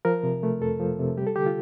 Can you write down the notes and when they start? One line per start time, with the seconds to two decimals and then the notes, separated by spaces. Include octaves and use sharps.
0.05 F3 A#4
0.23 C3
0.43 A3
0.61 F2 A4
0.80 F3
0.99 C3
1.17 G3 G4
1.27 A4
1.36 D3 G4
1.46 F4